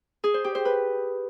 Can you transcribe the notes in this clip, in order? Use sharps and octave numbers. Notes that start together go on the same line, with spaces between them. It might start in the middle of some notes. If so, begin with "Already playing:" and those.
G#4
C5
G4
C5
B4